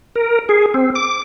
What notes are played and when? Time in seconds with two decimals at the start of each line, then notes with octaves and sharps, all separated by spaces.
0.16 A#4
0.49 G#4
0.74 C4
0.95 D6